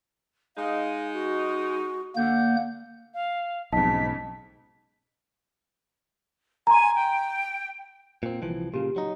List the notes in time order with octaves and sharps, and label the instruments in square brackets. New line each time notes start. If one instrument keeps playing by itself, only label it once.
[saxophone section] G#3 D#4 [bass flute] F5
[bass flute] F#4
[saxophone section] D3 [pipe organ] A#3 G6 [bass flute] F#5
[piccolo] F5
[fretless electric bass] B1 G#2 [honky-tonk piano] F2 C#3 D#4 [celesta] A5 [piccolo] B6
[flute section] G#5 [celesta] A#5 C6
[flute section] G5
[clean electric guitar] A#2 C4
C2 E3 F3
[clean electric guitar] A#2 C#3 [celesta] G4
[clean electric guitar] F#3 D#4